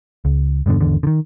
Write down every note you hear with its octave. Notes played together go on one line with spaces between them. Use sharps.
C#2
E1 G2 B2 D3
G#1 E2 D3
D3 D#3